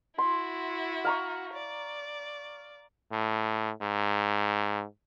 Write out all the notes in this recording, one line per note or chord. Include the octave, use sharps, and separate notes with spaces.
E4 F#4 C6
F5 A#5 C#6
D5
A2
G#2